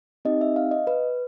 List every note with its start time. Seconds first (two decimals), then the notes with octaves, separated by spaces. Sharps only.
0.25 C4 D#4 G4 D#5
0.41 E5
0.56 F5
0.71 D#5
0.87 B4